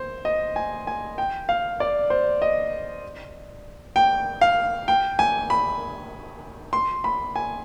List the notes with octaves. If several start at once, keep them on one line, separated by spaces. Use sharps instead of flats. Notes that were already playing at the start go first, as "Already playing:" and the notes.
Already playing: C5
D#5
G#5
G#5
G5
F5
D5
C5
D#5
G5
F5
G5
G#5
B5
C6
B5
G#5